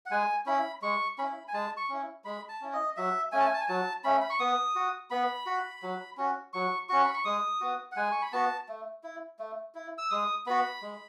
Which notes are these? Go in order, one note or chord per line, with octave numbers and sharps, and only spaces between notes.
F#5
G#3 G#5
C#4 E4 B5
G#3 C#6
C#4 E4 B5
G#5
G#3 A5
C#6
C#4 E4
G#3 B5
A5
C#4 E4
D#5
F#3 E5
A3 C#4 G#5
A5
G#5
A5
G#5
F#3 A5
A3 C#4 B5
B5
C#6
B3 D#6
F#4
B3 B5
F#4
F#3
C#4 F#4
F#3 C#6
C#4 F#4 C#6
B5
C#6
G#3 D#6
B3 F#4
F#5
G#3 G#5
C#6
B5
B3 F#4 A5
A3
E4
A3
E4
E6
G#3 D#6
B3 F#4 B5
G#3